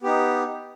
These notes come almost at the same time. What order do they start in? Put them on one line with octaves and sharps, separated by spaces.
B3 G4 D#4